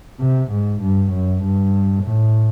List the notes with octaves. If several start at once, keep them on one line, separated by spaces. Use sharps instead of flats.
C3
G#2
G2
F#2
G2
A2